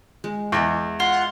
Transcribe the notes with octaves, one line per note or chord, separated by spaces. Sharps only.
G#3
E2 D#5 E5
F4 F#5